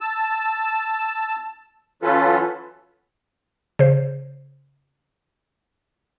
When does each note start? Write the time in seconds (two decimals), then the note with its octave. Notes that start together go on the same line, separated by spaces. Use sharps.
0.01 A5 E6
2.02 E3 F#3 C#4 F4 A4 B4
3.79 C#3 C5